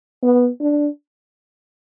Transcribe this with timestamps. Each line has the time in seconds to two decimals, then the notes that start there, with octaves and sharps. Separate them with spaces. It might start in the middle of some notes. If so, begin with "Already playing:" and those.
0.23 B3
0.61 D4